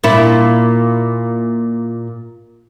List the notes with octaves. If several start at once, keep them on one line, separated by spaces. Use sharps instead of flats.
A#2 E4